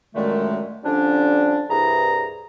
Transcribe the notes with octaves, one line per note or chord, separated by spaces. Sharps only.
F#2 A#2 D3 D#3 G#3 A3
D3 F3 G3 C#4 D4
C2 G2 E3 G#4 A#5